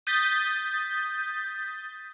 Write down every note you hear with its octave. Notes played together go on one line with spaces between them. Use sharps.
D#6 G6 A6 B6